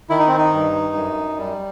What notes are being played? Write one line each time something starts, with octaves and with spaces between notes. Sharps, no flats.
D#3 E4
D#4
C4
D#4
G2
F#2
G3